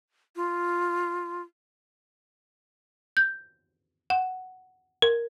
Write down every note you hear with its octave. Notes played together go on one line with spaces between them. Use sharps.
F4
G6
F#5
A#4